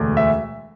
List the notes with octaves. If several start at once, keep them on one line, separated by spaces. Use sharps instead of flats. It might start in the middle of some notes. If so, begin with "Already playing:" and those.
Already playing: E1 D2 A3
E5